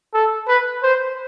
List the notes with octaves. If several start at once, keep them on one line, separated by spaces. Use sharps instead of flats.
A4
B4
C5